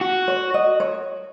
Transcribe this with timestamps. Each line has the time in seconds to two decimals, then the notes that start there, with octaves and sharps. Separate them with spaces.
0.01 F#4
0.28 C#5
0.54 D#5
0.80 C#5